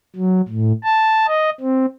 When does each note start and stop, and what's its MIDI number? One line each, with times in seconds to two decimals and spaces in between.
0.16 0.41 54
0.48 0.72 45
0.84 1.26 81
1.28 1.50 75
1.60 1.86 60